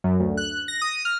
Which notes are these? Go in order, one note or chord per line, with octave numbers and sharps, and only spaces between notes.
F#2
D2
F#6
A#6
D#6
F6